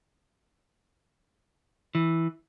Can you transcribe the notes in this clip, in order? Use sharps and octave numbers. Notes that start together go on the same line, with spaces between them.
E3